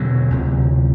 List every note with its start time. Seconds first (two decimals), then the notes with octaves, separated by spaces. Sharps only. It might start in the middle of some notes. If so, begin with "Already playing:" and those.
Already playing: E2 B2 D3 F#3
0.30 D2 C3